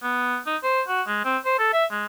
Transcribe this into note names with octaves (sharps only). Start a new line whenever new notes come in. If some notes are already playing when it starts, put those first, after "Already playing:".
B3
D#4
C5
F#4
G#3
C4
C5
A4
E5
G#3